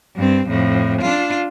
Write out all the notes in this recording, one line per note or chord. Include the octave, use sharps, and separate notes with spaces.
G2 C4
F2 A2
D4 F4